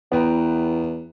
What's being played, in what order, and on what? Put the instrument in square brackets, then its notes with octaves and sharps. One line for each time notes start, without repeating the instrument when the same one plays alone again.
[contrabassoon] E2 [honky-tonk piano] B3 [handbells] E4 G5 A#5